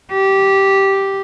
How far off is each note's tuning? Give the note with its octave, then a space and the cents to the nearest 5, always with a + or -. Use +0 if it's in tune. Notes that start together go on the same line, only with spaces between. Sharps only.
G4 -10